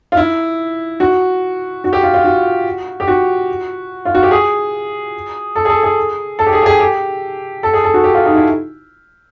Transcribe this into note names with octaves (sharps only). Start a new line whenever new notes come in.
F4
E4
F#4
F#4
G4
F4
F4
F#4
G4
F#4
F4
F#4
G4
G#4
A4
G#4
A4
G#4
A4
G4
G#4
G4
G#4
G4
A4
G#4
A4
F#4
G4
F4
D#4
E4